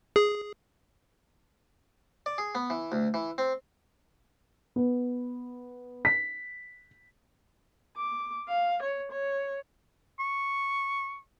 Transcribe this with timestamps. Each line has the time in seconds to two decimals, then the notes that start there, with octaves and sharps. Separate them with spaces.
0.16 G#4
2.26 D5
2.38 G#4
2.55 B3
2.70 E3
2.92 D2
3.14 E3
3.38 C4
4.76 B3
6.05 B6
7.97 D6
8.48 F5
8.83 C#5
9.11 C#5
10.19 C#6